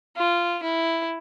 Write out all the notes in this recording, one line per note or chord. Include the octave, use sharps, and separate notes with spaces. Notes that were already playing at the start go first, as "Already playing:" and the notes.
F4
E4